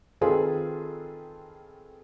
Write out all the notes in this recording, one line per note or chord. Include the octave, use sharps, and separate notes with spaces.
D#3 C4 F4 G#4 A4 B4